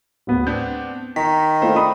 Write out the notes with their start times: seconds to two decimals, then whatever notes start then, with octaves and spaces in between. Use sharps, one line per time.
0.27 D1 B3
0.47 B3 C4 D4 G6
1.16 D#3 A#5 B6
1.62 A3 E4 F4 C5
1.76 D4 B5 D#6